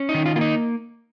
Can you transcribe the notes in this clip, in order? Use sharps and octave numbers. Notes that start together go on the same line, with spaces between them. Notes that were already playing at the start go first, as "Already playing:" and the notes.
Already playing: C#4
D#4
D#3
F4
A#3 F4
D#4